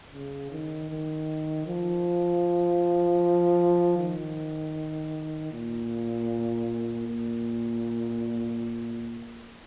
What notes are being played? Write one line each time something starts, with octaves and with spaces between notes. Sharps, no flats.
C#3
D#3
D#3
F3
D#3
A#2
A#2